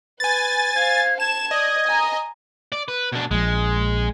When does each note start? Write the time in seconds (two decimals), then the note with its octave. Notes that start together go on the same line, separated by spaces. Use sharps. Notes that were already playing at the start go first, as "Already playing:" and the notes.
0.20 B4 G#5 A6
0.75 C5 F5 G#6
1.20 A5 G#6 E7
1.51 D5 D#5
1.87 G#5 A#5
2.72 D5
2.88 B4
3.12 B2 D4
3.31 A#1 F3 G#3